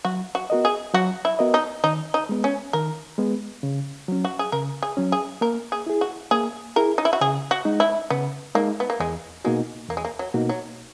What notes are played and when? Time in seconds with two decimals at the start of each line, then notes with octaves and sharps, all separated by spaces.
0.05 F#3 F#4
0.35 F#4
0.50 B3 F#4 A#4 D#5
0.65 G#4
0.94 F#3 F#4
1.25 E4
1.39 B3 F#4 A#4 D#5
1.54 D#4
1.84 D#3 D#4
2.14 D#4
2.29 G#3 B3
2.44 C#4
2.73 D#3 A#4
3.18 G#3 B3
3.63 C#3
4.08 F#3 C#4
4.25 F#4
4.39 G#4
4.52 C#3 A#4
4.83 G#4
4.97 F#3 C#4
5.12 G#4
5.41 A#3 A#4
5.72 G#4
5.87 E4 G#4
6.01 F#4
6.31 A#3 G#4
6.76 E4 G#4 A#4
6.98 D#4
7.05 E4
7.13 F#4
7.21 C#3 G#4
7.51 F#4
7.65 G#3 D#4
7.80 E4
8.10 C#3 B3
8.55 G#3 A#3 D#4
8.80 B3
8.90 A#3
9.00 E2 G#3
9.45 B2 G#3 A#3 D#4 F#4
9.89 E2 A#3
9.97 G#3
10.05 A#3
10.19 F#3
10.34 B2 A#3 D#4 F#4
10.49 F#3